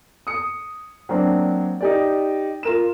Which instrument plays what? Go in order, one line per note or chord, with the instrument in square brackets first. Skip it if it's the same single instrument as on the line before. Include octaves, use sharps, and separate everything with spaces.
[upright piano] D#6 C#7
F#3 A#3 C4 D4
D#4 G4 D5
F4 A#4 E7